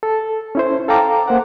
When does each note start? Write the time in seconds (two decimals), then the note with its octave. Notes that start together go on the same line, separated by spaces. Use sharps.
0.03 A4
0.55 C#4 E4 C5
0.88 A4 F5 G5 A#5 D6
1.28 A#3 C5 F#5